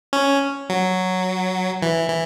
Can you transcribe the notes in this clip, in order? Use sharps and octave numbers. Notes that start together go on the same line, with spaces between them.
C#4
F#3
E3
E3